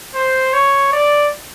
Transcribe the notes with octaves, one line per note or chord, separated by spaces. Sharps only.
C5
C#5
D5